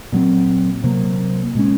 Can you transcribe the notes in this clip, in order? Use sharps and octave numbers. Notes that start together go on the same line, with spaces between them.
A#2 F#3 C4
C3 F#3 A#3
A#2 G#3 C#4